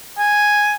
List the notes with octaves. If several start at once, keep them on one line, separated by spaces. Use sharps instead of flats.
G#5